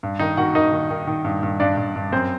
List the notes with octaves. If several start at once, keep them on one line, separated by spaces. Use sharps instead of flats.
G2
D#3 D#4 D#5
D#3 F#4 F#5
D#3 D#4 D#5
D#3
D#3
D#3
G2
G2
G2 D4 D5
G2
G2
F#2 C4 C5